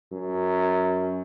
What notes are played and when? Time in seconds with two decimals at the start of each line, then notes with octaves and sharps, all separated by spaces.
0.13 F#2